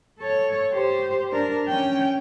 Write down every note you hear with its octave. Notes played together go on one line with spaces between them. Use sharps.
A4 C#5
G4 C5
D4 A#4
C#4 G5